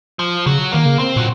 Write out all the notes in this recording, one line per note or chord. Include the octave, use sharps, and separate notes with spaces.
F3
C#3 F#3
D#3 A#3
C#3
C4
A#2 F#3